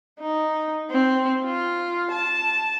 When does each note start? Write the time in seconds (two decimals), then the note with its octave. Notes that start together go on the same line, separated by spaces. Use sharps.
0.20 D#4
0.91 C4
1.45 F4
2.11 A5